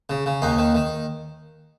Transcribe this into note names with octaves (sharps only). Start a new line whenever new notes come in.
C#3
C#3
D#2 D#4
D#3
D#3